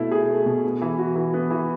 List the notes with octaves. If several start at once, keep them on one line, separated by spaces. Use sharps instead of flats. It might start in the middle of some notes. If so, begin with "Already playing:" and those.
Already playing: B2 A3 E4
G#4
A3
B2
B3
E3
F#4
E3
B3
E3